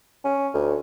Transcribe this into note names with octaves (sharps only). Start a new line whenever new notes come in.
C#4
D2